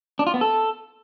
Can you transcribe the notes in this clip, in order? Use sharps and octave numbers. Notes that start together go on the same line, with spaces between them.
D4
F4
B3
A4